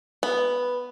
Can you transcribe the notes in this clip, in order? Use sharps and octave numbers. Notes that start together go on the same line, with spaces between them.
B3